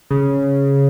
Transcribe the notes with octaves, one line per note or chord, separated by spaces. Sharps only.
C#3